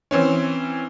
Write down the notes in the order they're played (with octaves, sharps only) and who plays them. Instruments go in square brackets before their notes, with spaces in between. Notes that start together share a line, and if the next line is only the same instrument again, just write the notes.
[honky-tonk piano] E3 C4 C#4